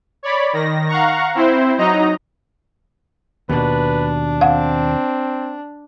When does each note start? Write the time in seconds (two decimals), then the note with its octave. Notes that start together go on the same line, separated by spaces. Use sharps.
0.23 C#5 D5 B5
0.53 D#3 A#6
0.88 F5 F#5 A#5 C#6
1.35 C4 E4 C5
1.78 F#3 D#4 D#5 A#5
3.49 D#2 B2 D4 B4
4.41 C4 F5 F#5